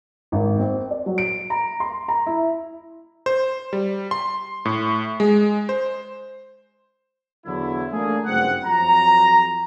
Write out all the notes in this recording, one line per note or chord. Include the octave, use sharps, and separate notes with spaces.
G#1
C4
D5
F#3
D7
A#5
C6
A#5
E4
C5
G3
C6
A2
G#3
C5
E2 D3 F#3 E4
A3 A#3 D4 G#4
F#1 G2 C4 F#5
F2 F#3 A#5